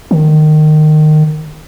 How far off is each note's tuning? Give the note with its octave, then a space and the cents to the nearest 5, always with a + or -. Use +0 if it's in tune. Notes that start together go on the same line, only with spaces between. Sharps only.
D#3 -20